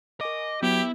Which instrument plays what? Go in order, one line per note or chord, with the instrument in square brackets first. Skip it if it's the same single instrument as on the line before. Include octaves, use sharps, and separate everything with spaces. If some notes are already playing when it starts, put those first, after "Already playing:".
[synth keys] A#4 G#5 C#6 [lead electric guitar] D#5 [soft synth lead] D6
[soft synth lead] F#3 [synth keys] B3 [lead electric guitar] E4 [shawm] G4